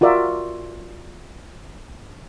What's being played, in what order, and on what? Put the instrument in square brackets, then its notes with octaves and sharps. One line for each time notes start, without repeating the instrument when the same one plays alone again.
[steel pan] F4 F#4 A#4 D5 E5